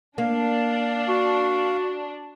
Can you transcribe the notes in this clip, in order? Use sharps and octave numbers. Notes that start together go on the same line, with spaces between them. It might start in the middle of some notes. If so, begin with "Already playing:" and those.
A#3 D4 F5
F#4